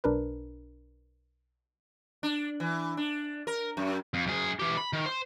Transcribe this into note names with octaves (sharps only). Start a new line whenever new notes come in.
B1 D4 A#4 B4
D4
E3
D4
A#4
F#2
F2
F#2 G#4
E3 G4
B5
D#3
C5